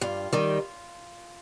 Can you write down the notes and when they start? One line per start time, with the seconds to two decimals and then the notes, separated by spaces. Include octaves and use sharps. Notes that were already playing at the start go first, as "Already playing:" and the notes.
0.01 G2 F4
0.33 D#3 G3